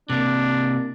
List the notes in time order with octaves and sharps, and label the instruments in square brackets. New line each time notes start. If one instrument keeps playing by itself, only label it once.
[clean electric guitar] C3 A#3 [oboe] D4